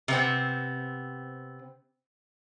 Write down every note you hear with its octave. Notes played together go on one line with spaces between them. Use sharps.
C3 B3 C4